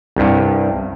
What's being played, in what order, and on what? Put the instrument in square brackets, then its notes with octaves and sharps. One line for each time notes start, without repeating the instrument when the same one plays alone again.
[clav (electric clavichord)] C2 G2